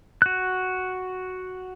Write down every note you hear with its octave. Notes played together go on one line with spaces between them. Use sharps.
F#4 F#6